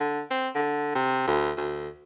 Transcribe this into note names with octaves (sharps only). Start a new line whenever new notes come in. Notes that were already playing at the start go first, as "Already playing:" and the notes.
D3
C4
D3
C3
D2
D2